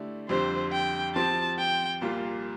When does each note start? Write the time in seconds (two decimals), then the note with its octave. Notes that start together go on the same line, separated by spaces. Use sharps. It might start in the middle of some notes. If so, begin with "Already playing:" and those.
Already playing: D3 A3 E4 G4 D5
0.29 F2 D3 G3 C4 G4 C5
0.73 G5
1.16 F3 C4 G4 A5
1.59 G5
2.02 C2 A#2 G3 A#3 F4